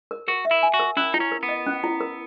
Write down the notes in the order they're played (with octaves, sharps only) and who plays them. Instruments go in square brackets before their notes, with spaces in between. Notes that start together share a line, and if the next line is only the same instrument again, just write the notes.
[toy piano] A#4
[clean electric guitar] F#4 [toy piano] A#4
[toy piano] E5
[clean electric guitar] E4
[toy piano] G#5
[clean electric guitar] F#4
[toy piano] A#4
[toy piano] C#4 [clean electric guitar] E4
[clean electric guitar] D#4 [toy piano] E4
[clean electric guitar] C#4
[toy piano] A#4
[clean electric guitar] B3
[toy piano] D#5
C#4
E4
A#4